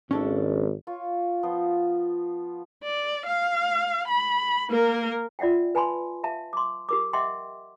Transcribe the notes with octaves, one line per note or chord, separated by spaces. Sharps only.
G#1 C#4 D4 A4
F4 C#5
F3 B3 C5
D5
F5
B5
A#3 A#4
F4 D5 E5 F#5 G5
B4 G#5 A5 B5 C6
E5 F5 A5
C6 D6
G4 A#4 D6
D#5 E5 F#5 G5 C6 D6